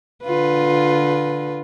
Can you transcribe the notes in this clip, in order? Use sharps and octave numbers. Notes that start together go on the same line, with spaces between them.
D3 F4 B4